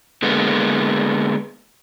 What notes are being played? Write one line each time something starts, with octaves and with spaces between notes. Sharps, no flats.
D3 G#3 A#3 B3